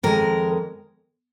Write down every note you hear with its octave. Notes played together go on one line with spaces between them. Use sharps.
F2 D#3 G#3 A#4